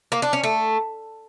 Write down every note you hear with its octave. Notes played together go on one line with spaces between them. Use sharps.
A#3
D4
C#4
A3